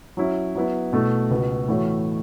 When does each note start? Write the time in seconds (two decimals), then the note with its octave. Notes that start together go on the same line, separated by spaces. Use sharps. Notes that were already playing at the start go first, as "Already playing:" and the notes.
0.17 F#3 C#4 E4
0.55 F#3 B3 E4
0.93 B2 A3 E4
1.31 C#2 B2 B3 F#4
1.68 A2 E3 A3 F#4 C#5